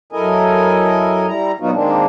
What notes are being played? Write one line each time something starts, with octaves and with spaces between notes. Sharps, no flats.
F#2 E4 A4 A#4 D#5 G#5
G3 E4 A#5
A#2 F#3 B3 D#4 F4 F#4
D#3 G#3 A#3 C4 D4